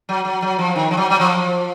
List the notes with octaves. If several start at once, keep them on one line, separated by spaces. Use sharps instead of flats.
F#3
F#3
F#3
F3
D#3
F3
F#3
F#3
F3